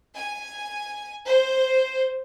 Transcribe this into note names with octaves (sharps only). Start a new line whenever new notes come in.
G#5
C5